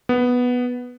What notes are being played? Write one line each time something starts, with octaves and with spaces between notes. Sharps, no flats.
B3